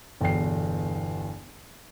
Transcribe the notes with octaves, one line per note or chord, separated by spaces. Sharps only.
G1 E2 B2 G5 C7